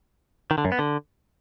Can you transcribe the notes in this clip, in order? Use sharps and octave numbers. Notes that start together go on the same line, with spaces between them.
D#3
D3
F#2
B3
D3